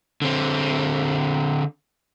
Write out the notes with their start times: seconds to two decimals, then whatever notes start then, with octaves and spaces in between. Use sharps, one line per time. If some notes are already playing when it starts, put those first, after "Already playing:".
0.22 D3 C4